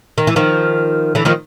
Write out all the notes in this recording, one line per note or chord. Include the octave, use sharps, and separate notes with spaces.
D#3
E3
D#3 F3
D3 E3
D#3 F3